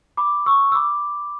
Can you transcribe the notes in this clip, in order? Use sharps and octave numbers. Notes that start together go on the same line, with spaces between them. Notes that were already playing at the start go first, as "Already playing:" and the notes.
B5 D6
C#6 E6
E6
B5 D6